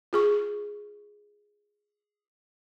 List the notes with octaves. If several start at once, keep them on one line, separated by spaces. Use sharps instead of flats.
F4 G#4 C#6